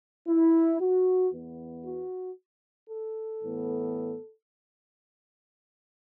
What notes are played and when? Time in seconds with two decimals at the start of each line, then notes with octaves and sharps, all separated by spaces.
0.28 E4
0.81 F#4
1.33 E2 E3 B3
1.86 F#4
2.90 A4
3.42 A2 E3 B3